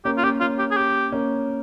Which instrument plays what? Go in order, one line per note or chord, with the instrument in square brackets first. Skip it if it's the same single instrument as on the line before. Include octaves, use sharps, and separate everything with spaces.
[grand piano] A#3 C#4 [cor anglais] G4
[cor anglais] F4
[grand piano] A#3 C#4 [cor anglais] G4
[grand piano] A#3 C#4 [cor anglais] F4
[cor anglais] G4
G#4
G4
[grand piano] A#3 C#4